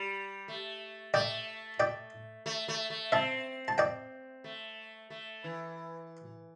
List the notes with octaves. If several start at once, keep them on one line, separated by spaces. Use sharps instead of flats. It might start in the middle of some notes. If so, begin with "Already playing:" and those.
Already playing: G3
A3
A3 D5 G5
D5 G5
A3
A3
A3
C4 E5 A5
A5
D5 G5
A3
A3
E3